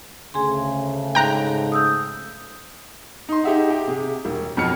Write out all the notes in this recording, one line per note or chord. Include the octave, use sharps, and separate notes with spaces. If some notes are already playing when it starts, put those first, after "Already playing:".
D2 C#3 A3 G#4 G#5 C6
G#2 G5 A#5 F#6
D#6 E6 G6
D#4 C6
D#4 G4 G#4 E5 F#5
G4
C3 G4 G#4
E1
F2 B2 F#3 F6 C#7